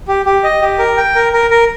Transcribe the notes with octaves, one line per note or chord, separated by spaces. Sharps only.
G4
G4
D#5
G4
A#4
G5
A#4
A#4
A#4